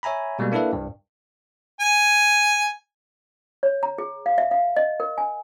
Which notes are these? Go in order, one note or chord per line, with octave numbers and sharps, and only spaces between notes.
C#5 E5 G#5 A#5 B5
B2 G3 G#3 A#3
A#3 D4 E4 A4 B4 E5
C2 G2
G#5
C#5
A#5
G#4
F5
E5
F5
D#5
A#4
G#5